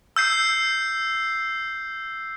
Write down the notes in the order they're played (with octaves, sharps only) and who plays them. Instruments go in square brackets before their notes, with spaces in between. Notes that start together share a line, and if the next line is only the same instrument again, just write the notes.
[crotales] E6 G6 C7